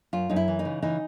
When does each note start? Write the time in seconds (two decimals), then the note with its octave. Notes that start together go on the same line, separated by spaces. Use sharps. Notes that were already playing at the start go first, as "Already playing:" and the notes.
0.13 F#2 F4
0.30 F#2 D#4
0.36 E4
0.48 E3
0.59 D#4
0.65 C#3
0.82 E3 D#4